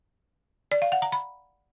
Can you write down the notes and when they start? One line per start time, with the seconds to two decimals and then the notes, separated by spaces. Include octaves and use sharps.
0.72 D5
0.82 F5
0.92 F#5
1.02 A#5
1.12 B5